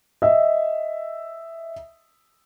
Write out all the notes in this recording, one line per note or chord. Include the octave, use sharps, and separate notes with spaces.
D#5 E5